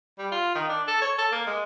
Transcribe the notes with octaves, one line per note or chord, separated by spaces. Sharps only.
G3
F4
D#3
D4
A4
C#5
A4
A#3
G#3